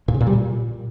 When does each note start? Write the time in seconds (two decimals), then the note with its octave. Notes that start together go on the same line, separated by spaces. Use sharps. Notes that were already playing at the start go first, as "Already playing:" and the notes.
0.08 A#2
0.14 C#3
0.21 A#2
0.27 G3
0.33 A#2